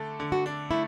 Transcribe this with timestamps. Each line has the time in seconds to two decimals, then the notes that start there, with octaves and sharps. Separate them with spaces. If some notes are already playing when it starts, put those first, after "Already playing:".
Already playing: D3 A3 D4 A4
0.20 D3
0.32 F#4
0.46 D4
0.71 A3 E4